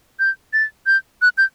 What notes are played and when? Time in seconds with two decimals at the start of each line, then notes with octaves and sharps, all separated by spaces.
0.19 G6
0.53 A6
0.87 G6
1.22 F#6
1.38 G6